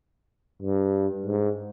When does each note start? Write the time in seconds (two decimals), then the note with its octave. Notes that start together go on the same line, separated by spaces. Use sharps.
0.62 G2
1.26 G#2